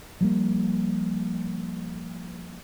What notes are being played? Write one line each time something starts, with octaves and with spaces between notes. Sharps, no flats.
F3 G3 A#3